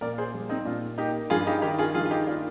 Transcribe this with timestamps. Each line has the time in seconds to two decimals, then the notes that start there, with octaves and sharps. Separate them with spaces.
0.01 A#2 A#4 D5
0.18 G#4 C5
0.34 G3
0.49 C4 D#4
0.65 A#2 D4 F4
0.98 A#3 D#4 G4
1.30 G2 F4 G#4
1.46 D#4 G4
1.62 D#3 D#4 G4
1.79 F4 G#4
1.94 G2 F4 G#4
2.06 F4
2.11 D#4 G4
2.27 A#3 D4 F4